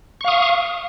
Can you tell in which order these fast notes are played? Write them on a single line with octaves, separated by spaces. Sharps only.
C#6 F5 D#6